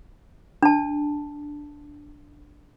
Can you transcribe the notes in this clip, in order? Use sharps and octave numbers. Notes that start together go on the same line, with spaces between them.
D4 A5